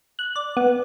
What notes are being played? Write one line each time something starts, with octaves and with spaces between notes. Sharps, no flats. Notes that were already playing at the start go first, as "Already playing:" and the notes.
F#6
D5
B3